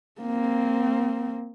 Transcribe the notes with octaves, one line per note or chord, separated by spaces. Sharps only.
A#3 C4